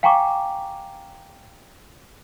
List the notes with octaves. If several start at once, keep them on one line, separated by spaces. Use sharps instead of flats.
F5 G5 G#5 A#5 C#6 D6